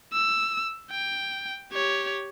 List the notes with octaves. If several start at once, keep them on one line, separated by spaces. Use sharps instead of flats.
E6
G5
G4 C#5